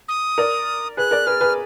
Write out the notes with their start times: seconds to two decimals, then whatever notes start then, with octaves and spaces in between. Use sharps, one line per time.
0.08 D#6
0.38 A#4 D5
0.97 G#4 B4 F#6
1.11 A#4 D5
1.27 G#4 B4 F6
1.41 G#4 B4